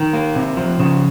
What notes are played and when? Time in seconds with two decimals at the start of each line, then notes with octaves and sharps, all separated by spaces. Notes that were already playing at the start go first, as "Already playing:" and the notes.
Already playing: D#3
0.13 A#3
0.36 C3
0.57 F3
0.80 C#3